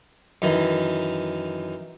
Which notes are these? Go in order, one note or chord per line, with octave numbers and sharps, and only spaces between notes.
F#2 D#3 E3